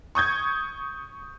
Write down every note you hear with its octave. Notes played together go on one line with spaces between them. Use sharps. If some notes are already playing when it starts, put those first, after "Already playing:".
C#6 D#6 G6 G#6